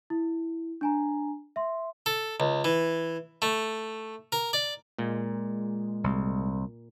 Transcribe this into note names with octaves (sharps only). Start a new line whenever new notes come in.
E4
D4 G#5 A#5
E5 C6
A4
C#2
E3
A3
A#4
D5
A#2 G#3
C2